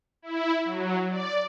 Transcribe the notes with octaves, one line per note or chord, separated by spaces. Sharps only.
E4
F#3
D5